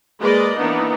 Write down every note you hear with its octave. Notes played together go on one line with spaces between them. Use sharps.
G#3 A#3 G#4 B4 D5 D#5
E3 A#3 B3 D4 D#4